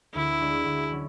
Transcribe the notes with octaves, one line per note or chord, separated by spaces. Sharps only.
D2 E4
D3 G#3 D4 F#4
D2
D3 F#3 C#4